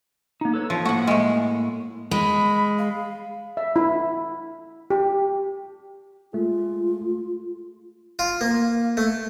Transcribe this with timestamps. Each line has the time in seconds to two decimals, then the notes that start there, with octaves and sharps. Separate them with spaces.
0.41 A#3 D#4
0.54 A4 B4 C#5
0.70 F3
0.85 A2 A#3 F#4 F#5
1.07 G#3 A3
2.11 G#3 B5
2.78 F5
3.57 E5
3.76 E4
4.90 G4
6.33 G#3 A3 F4 G#4
8.19 F4
8.41 A#3
8.97 A3